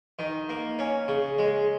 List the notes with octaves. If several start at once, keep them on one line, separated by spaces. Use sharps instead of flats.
D#3
A#3
C#4
C#3
G#3